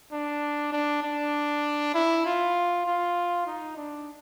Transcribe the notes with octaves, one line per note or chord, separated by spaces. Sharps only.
D4
D4
D4
E4
F4
F4
D#4
D4